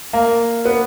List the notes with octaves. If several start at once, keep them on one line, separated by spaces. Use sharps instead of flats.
A#3
B3